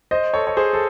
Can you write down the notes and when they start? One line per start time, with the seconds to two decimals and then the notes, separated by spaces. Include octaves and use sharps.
0.11 C5 D#5
0.34 A4 C#5
0.47 C#5
0.57 G#4 C5
0.73 A4